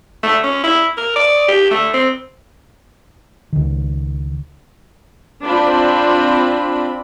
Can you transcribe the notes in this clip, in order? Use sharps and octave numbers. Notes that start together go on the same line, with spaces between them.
A3
C#4
E4
A#4
D5
G4
A3
C4
C#2 D#3
C4 D4 F4 B5